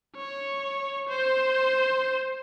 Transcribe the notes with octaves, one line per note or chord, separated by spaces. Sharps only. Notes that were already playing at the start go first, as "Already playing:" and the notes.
C#5
C5